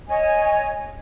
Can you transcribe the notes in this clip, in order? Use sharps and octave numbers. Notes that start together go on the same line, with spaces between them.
C#5 D#5 G#5